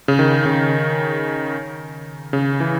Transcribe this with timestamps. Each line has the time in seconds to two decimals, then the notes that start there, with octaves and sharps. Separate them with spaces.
0.08 C#3
0.19 D#3
0.46 C#3
2.33 C#3
2.60 E3